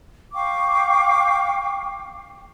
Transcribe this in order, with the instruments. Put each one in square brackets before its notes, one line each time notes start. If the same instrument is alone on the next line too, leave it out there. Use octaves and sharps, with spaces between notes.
[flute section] F5 G5 C#6 D6